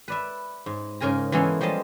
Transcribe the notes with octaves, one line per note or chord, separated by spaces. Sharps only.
B4 D5 E5
G#2
G#2 C#3 A#4 G#5 A#5
E3 G#3 A#3 B3 C#4 A4
F3 G3 G#3 D#5 A5